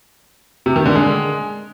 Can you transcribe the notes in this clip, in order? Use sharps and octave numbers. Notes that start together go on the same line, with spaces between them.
C3
D#3
D3
G#3